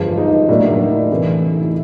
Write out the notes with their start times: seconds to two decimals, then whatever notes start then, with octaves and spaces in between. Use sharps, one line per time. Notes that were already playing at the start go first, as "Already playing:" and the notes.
Already playing: G2 D3 F3 G#3
0.18 D#4
0.48 A2 F#3 A#3 D4
0.80 D#4
0.94 D4
1.11 C3 E3 A3
1.52 D#4
1.62 E4